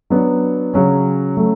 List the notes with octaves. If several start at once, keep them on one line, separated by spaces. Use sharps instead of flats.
F#3 B3 D4
C#3 F#3 C#4
F#3 A3